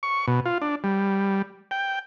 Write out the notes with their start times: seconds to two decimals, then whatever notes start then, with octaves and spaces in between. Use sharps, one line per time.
0.03 C#6
0.28 B2
0.46 F4
0.62 D4
0.84 G3
1.71 G5